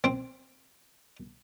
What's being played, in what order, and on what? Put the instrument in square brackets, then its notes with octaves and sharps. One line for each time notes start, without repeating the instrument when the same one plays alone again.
[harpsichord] C4